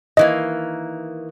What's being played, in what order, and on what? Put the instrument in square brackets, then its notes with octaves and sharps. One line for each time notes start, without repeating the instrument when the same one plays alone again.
[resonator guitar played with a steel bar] D#3 E3 A#3 [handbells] D#5